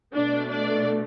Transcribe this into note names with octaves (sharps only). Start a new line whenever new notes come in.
B2 A3 D4 D5
D4 D5